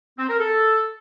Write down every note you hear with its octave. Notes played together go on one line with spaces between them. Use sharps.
C4
A#4
A4